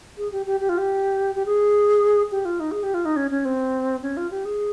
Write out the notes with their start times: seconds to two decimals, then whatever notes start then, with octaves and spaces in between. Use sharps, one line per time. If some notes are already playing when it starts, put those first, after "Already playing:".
0.18 G#4
0.32 G4
0.46 G4
0.60 G4
0.69 F4
0.78 G4
1.35 G4
1.46 G#4
2.31 G4
2.45 F4
2.60 D#4
2.72 G#4
2.83 G4
2.94 F4
3.05 D#4
3.16 C#4
3.31 C#4
3.45 C4
4.02 C#4
4.17 F4
4.31 G4
4.45 G#4